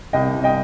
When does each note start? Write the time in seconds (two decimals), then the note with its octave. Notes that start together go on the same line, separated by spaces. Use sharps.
0.13 C2 D#5 G5
0.34 C2
0.44 D#5 G5